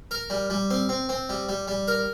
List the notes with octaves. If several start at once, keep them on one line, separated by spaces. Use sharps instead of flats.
A#4
G3
G3
C4
C4
C4
G3
G3
G3
A#4